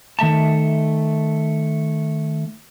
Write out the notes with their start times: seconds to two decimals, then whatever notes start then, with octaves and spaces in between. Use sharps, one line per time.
0.19 D#3 A3 E5 A5